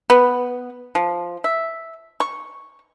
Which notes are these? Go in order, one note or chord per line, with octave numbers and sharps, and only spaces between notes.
B3
F3
E5
C#6